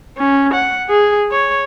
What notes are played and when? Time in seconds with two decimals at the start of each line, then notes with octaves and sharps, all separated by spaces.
0.18 C#4
0.54 F#5
0.89 G#4
1.32 C#5